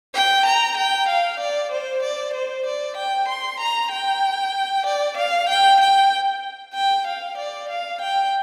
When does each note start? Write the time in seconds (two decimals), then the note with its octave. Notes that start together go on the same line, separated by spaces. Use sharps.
0.14 G5
0.46 A#5
0.77 G5
1.08 F5
1.40 D5
1.72 C5
2.03 D5
2.34 C5
2.66 D5
2.97 G5
3.28 C6
3.60 A#5
3.92 G5
4.86 D5
5.17 F5
5.49 G5
5.81 G5
6.74 G5
7.07 F5
7.38 D5
7.70 F5
8.01 G5